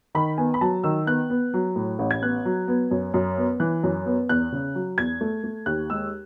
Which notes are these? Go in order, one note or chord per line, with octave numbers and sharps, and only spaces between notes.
D#3 B5
B3 G#5
B5
F#3 A5
D#3 E6
B3 F#6
B3
F#3
A2
A1
G#6
B3 F#6
F#3
B3
F#2
F#2
B3
E3 F#6
F#2
B3
E2 F#6
C#3
F#3
E2 G#6
A3
A3
D#2 F#6
G#3 E6